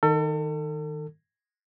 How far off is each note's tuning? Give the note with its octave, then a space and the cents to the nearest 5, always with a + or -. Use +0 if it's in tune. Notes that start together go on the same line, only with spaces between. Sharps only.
D#3 +0 A4 +35